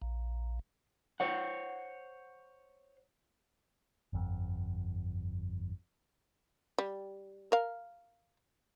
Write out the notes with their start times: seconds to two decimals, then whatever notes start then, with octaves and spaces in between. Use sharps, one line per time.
0.02 A#1
1.20 C5 C#5 F#5
4.13 G1 F2
6.78 G3
7.52 A#4 F5